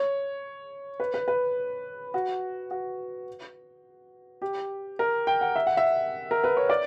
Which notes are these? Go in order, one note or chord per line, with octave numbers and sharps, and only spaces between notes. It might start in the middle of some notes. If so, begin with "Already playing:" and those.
Already playing: C#5
B4
B4
B4
F#4
F#4
G4
A#4
G5
F#5
E5
F#5
E5
A#4
B4
C#5
D5